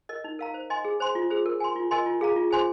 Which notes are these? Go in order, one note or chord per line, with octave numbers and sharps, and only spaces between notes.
A#4 D#5
D#4
A#4 F5 A#5
C5
D#5 G#5 C6
G#4
C5 G#5 C6
F4
G#4 C5
A#4
G#5 C6
F4
A#4 D#5 G#5 C6
F4
G#4 F5 A#5
F4
G#4 C5 G#5 C6